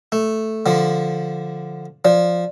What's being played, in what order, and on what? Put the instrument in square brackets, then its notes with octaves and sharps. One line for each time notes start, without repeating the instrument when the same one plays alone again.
[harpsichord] A3
D3 F3
[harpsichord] F3 [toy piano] D5